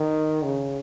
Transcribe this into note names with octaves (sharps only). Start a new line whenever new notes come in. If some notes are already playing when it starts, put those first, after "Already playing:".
Already playing: D#3
C#3